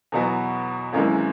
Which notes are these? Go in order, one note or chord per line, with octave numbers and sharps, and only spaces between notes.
E2 B2 F#3 B3 F#4
G#1 F#2 E3 G#3